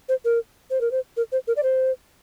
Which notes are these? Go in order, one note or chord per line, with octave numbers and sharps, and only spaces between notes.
C5
A#4
C5
A#4
C5
A#4
C5
A#4
D5
C5